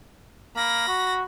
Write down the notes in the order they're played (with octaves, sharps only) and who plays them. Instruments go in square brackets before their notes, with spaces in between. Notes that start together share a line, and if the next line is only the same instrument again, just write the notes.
[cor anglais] A#3 [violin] B5 A#6
[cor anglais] F#4